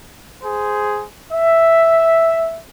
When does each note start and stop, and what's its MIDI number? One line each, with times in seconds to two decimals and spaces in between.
0.43 1.05 68
0.43 1.05 72
1.32 2.57 76